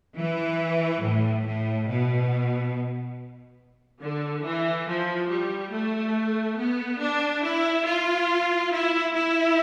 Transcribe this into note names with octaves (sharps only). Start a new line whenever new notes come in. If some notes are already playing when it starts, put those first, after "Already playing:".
E3
A2
A2
B2
D3
E3
F3
G3
A3
B3
D4
E4
F4
E4
E4